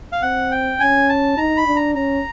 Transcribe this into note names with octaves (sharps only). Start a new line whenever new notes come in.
F5
C4 F#5
G5
C#4 G#5
A5
D#4 A#5
B5
D4
A#5
C#4 A#5